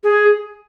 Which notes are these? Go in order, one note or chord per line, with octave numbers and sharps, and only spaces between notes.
G#4